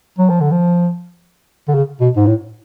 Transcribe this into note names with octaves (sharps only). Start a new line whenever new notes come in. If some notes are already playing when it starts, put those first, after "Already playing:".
F#3
F3
D3
F3
D3
C#3
B2
G#2
A2